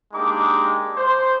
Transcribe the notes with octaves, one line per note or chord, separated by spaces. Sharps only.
G#3 A#3 D4 D#4 G4 D6
C5